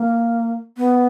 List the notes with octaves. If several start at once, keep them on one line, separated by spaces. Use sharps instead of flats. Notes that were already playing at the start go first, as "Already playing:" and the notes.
Already playing: A#3
B3